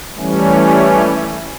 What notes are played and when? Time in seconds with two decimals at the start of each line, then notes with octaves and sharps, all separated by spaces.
0.17 E3 G3 A3 C#4